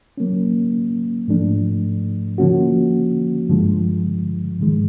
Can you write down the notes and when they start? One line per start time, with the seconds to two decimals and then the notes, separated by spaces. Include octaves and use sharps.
0.17 F#3 A#3 C#4
1.28 G#2 F3 A3 D4
2.38 D3 F3 A#3 C#4 F#4
3.49 G2 D3 F3 G#3
4.60 G#2 D#3 G#3